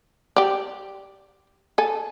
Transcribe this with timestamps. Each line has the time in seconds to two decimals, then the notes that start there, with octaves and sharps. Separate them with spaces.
0.36 G4 D5
1.78 A4 G#5